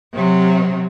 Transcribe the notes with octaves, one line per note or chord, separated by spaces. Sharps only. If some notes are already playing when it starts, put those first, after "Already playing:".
C3 F#3